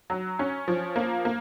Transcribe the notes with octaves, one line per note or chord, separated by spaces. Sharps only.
F#3
C#4
F3
A#3
A#3